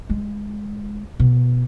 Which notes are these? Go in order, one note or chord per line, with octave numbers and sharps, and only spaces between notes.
G#3
B2